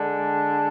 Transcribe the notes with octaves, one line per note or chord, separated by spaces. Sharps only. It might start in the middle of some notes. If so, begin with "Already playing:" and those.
Already playing: D3 G#3 D4